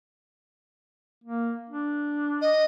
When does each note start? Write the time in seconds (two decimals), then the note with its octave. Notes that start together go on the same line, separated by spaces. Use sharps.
1.24 A#3
1.69 D4
2.41 D#5